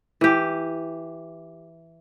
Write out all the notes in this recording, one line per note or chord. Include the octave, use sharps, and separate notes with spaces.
E3 G4